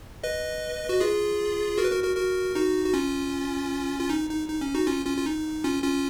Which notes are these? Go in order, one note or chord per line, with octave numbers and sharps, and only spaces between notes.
B4 D#5
F#4
F4 G#4
F#4 A#4
B4
F#4 A#4
F#4 A#4
F#4 A#4
D#4 F#4
F#4
C#4 F4
F4
D#4
D#4
D#4
C#4
D#4 F#4
C#4 F4
C#4 F4
F4
D#4
C#4 F4
C#4 F4